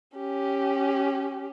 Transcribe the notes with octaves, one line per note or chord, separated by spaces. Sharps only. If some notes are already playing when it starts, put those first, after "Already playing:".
C#4 G4